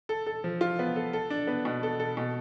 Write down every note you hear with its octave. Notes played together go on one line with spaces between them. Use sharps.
A4
A4
F3
F4
B3
A4
A4
D4
B3
B2
A4
A4
B2